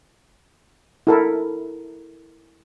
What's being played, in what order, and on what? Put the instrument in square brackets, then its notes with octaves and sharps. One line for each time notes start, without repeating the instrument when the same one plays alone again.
[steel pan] E4 A4 A#4